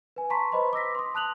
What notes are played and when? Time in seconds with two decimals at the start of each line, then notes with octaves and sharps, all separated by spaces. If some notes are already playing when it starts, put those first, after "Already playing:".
0.16 B4 G#5
0.30 A5 A#5 C6 C#6 B6
0.52 B4 C5 D#5 B5 C6
0.73 D6 E6 A#6 B6
0.95 C6 D#6
1.15 A5 F#6 F7 F#7